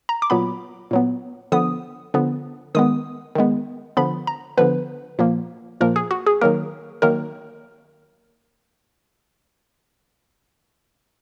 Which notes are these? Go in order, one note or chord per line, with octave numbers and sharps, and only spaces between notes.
A#5
D6
A#2 F#3 B3 B5
A#2 F#3 B3
D3 F3 B3 D#6
D3 F3 B3
D#3 G#3 B3 D#6
D#3 G#3 B3
D3 F3 B3 B5
A#5
D3 F3 B3 B4
A#2 F3 A#3
A#2 F3 A#3 A#4
G#4
F#4
G#4
D#3 F#3 A#3 A#4
D#3 F#3 A#3 A#4